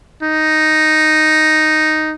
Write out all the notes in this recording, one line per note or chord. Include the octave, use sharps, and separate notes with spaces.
D#4